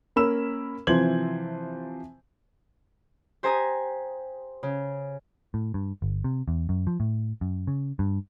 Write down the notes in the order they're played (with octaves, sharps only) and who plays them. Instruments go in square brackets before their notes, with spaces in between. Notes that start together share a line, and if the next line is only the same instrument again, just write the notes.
[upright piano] A#3 C#4 A#4 B5 E6 E7
C3 E3 F3 C5 G#6 F#7
[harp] G4 C5 G#5 A#5 D#6
C#3
[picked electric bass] A2
G2
G1
C3
E2
F#2
F3
A2
F#2
C#3
G2